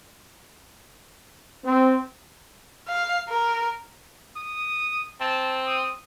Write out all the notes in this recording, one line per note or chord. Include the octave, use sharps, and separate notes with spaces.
C4
F5
A#4
D#6
C4 A5
D#6